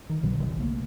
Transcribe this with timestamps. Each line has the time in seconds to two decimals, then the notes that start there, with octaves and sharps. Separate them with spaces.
0.09 D#3
0.22 B1 B2 D3 F#3
0.40 G#1 D#2 C3 D#3
0.56 B1 C#3 A3 A#3